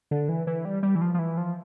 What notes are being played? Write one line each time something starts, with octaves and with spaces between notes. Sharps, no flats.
D3
E3
E3
G3
G3
E3
F3
F3
E3
F3